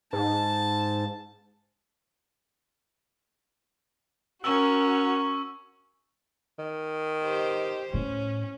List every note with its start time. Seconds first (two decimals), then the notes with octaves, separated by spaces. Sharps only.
0.13 G#2 A5
4.44 C#4 F#4 A#4 C#6 E6
6.59 D#3
7.23 G4 C5
7.94 A2 C#4